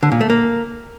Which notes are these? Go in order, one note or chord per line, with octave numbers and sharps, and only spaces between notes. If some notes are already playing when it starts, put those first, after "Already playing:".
D3
A#2
A3
A#3